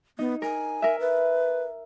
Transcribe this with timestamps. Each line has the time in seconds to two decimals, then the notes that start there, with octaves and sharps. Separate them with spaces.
0.19 B3 D#4
0.42 A#4 G#5
0.82 A#4 E5
1.00 B4